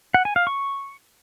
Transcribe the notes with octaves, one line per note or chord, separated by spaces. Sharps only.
F#5
G#5
F5
C#6